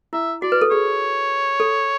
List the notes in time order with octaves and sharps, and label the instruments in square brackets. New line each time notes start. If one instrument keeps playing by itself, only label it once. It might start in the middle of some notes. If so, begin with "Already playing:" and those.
[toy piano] E4 [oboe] E5
[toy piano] F#4 [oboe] D5
[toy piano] B4
A4
[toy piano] G#4 [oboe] C#5
[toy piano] A4